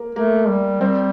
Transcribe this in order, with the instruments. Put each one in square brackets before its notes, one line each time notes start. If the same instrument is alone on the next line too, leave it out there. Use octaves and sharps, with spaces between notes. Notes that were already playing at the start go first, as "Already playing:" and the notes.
Already playing: [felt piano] A#3
[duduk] A3 [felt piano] A#3
[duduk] G3
[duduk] G3 [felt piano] C4